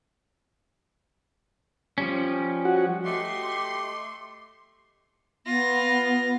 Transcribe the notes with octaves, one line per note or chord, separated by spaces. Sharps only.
F3 G3 C#4
F#4
A3 G4 D#5 E5 C6 D6
B3 F4 A#6